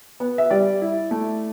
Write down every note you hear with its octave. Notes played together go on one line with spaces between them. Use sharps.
B3
E5
G3 D5
E4
A3